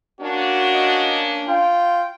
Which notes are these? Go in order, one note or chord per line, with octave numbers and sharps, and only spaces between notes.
A#3 C#4 D4 F#4
D#5
F4 G5